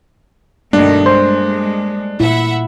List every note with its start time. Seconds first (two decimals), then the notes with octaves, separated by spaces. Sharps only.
0.73 G2 B2 D#3 G3 A3 A#3 D4
1.06 G#3 C5
2.20 A#2 E4 E5 F#5